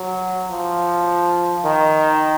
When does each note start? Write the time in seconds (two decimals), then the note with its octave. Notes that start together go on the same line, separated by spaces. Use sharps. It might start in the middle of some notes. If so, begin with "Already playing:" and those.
Already playing: F#3
0.51 F3
1.65 D#3